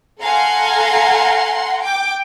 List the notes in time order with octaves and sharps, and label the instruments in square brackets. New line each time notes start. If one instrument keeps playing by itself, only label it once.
[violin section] A4 F5 F#5 G#5 A#5 C6
G5 D6